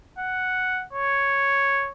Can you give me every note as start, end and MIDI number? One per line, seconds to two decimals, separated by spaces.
0.19 0.85 78
0.93 1.91 73